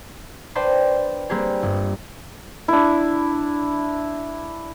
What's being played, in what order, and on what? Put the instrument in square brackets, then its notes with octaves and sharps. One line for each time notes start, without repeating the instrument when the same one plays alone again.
[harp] D4 B4 C5 D5 G5 A5
G3 A#3 C4 D4 G4 G#4
G1
[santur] D4 E4